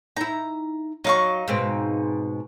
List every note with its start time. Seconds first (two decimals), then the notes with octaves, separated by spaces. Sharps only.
0.16 D#4 E4 A#5
1.04 F#3 D#4 F5 C#6
1.48 G#2 B2 C4